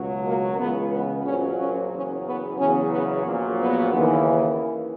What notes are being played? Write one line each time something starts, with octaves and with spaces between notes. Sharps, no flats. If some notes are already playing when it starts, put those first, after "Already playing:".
Already playing: C#2 B2 F#3
A#3
C#2 C#3 E3 B3
B3
A#1 A#2 F#3 C#4
C#4
F#1 E2 C#3 F#3 C#4
B3
E2 C#3 F#3 C#4
B3
A#1 A#2 F#3
B3
D#2 C#3 E3